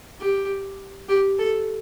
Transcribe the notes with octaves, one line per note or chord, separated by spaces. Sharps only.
G4
G4
A4